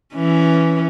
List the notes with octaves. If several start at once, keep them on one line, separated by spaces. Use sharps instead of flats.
E3 C#4